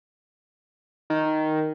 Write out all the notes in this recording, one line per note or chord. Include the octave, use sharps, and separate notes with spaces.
D#3